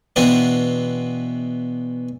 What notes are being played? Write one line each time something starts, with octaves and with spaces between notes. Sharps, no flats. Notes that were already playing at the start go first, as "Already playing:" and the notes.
B2 E3 B3 C4 D4